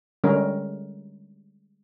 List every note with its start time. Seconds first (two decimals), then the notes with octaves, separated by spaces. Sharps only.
0.24 D3 G3 G#3 C#4 A#4